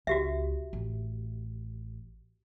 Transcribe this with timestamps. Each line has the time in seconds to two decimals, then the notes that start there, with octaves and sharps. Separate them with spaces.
0.07 C#2 F#4 G4 E5
0.73 A1